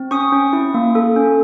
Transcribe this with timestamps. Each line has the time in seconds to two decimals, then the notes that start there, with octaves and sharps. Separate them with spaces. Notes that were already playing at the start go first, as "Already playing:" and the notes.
Already playing: C4
0.11 C#4 C#6 D#6
0.32 C#4
0.53 E4
0.74 A#3
0.95 A4
1.16 C#4